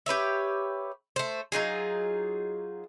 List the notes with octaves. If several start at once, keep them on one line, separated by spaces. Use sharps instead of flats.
G4 B4 C#5 E5
A3 C5
F#3 D#4 F4 G#4